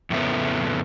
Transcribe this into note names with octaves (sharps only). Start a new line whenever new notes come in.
F2 A2 C#3 A3 B3